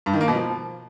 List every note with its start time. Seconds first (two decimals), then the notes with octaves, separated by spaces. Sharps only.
0.06 G2
0.13 D#3
0.21 A#3
0.28 B2
0.35 F3